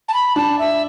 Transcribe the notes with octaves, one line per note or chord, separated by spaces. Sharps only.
A5
B5
D4 A5
E5